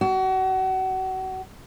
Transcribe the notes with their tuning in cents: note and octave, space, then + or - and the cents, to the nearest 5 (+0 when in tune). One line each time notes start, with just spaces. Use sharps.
F#4 +30